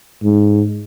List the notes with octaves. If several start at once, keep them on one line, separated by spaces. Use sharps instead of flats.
G#2